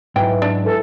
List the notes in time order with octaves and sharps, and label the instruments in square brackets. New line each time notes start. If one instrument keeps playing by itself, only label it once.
[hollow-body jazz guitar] G#2 F#3 [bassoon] E3 [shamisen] G5
[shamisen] D4
[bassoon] E3 [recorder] A4